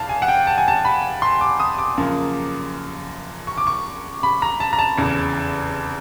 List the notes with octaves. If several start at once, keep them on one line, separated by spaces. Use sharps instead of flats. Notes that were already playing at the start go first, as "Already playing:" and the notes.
Already playing: E1 E2 F5 A5
G#5
F#5
G5
A5
G#5
A5
B5
C6
D6
D#6
D6
F#2 C#3 F3 A#3
C#6
D6
C#6
B5
A#5
A5
A#5
A5
F1 E2 C#3